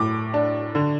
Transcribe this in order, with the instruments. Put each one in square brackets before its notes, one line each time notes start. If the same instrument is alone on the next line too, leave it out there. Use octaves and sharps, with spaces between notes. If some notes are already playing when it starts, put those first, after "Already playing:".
Already playing: [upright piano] A2 D6
D4
D3